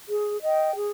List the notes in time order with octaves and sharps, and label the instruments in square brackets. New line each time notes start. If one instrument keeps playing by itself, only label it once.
[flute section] G#4
D#5 G5
G#4